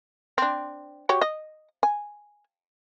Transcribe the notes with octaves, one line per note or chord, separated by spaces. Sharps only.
C4 D4
F#4 G4 C#5
D#5
G#5